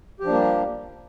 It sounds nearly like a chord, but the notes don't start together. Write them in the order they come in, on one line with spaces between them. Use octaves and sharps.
G4 F3 D4 A#3 G3